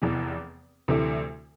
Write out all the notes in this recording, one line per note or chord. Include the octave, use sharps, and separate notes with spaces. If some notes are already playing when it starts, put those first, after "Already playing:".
F1 E2 E3
D2 C3 E3 A3 E4